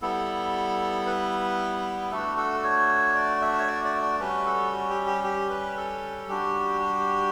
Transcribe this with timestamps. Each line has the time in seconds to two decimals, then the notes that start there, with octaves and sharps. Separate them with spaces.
0.02 G3 B3 E4 A4
1.07 B4
2.11 A3 D4 F#4 A4
2.37 A4
2.64 C#5
3.15 D5
3.42 E5
3.59 C#5
3.67 D5
3.85 D5
4.02 D5
4.19 G3 C#4 F#4 B4
4.46 A4
4.72 F#4
4.90 G4
5.07 G4
5.24 G4
5.50 B4
5.77 A4
6.28 G3 D4 F#4 G4
6.81 G4